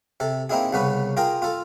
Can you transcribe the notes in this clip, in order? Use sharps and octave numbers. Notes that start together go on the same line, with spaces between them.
C3 A4
A#3 C4 D#4 E4 G#4
C2 C#3 B3 C#4 B4
F4 G#4 A#4 G5
F4 A4